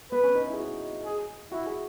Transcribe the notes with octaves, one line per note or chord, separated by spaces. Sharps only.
B3 B4
C#4
D#4
E4
G#4
F#4
G#4
E4 F#4
G#4